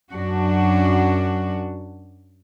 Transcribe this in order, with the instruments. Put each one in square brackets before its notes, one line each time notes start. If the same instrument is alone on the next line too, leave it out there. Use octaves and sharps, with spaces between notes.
[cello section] F#2 D4 F#4